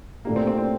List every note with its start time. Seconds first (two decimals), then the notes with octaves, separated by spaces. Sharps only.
0.25 A#2 A3 A#3 D4 G4
0.36 C4
0.47 C4
0.58 C4